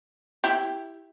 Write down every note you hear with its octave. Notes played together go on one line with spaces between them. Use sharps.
E4 G4